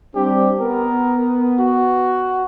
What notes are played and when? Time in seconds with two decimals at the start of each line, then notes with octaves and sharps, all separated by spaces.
0.16 G3 C4 D4 G4
0.60 B3 A#4
1.59 F#4